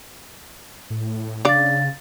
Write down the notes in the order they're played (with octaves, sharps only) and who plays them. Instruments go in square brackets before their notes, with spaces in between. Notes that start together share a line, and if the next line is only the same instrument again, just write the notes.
[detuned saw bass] A2
[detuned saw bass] C#3 [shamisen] D4 D5 [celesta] F5 A6